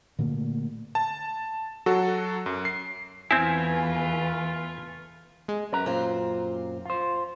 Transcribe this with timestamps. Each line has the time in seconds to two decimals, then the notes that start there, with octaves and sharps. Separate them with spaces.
0.19 A#2 D3 A3 A#3
0.95 A5
1.86 F#3 F#4 A4
2.46 F#2
2.65 C7
3.31 E2 E3 A3 C4 E4 F4 B4 G#5
5.48 G#3
5.72 F#2 B4 A#5
5.86 A#2 C4 F4
6.85 F4 C5